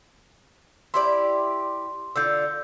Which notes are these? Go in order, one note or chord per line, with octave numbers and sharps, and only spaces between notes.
E4 G4 D5 C6
D3 F4 E6 G6